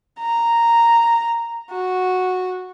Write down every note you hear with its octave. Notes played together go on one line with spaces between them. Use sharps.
A#5
F#4